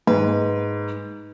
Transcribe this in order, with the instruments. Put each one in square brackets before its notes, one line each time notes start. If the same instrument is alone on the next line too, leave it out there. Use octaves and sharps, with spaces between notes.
[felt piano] G#2 [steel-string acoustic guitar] B4